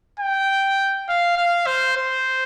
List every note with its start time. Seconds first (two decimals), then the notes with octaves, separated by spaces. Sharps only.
0.19 G5
1.08 F5
1.37 F5
1.66 C5
1.97 C5